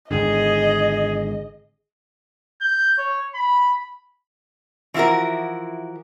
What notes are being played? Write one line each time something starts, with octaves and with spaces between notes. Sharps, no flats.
G#1 G#2 D3 G#4 D#5
G6
C#5
B5
E3 F3 E4 F#4 A#4